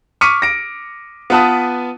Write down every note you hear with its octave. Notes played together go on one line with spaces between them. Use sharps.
C#6 D6 F6 B6 C#7 D#7
A#6 D7
B3 F4 B4 A5 D#6